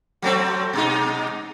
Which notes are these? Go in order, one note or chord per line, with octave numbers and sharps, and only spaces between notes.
F#3 A3 C4
B2 G#3 D#4